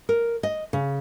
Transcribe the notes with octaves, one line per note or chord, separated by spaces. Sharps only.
A#4
D#5
C#3